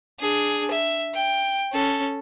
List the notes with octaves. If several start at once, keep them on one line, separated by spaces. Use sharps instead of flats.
D4 G#4
E5
G5
C#4 A4